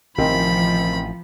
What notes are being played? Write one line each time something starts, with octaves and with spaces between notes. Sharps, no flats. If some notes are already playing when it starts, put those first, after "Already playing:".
A1 C3 D#3 F3 C4 B5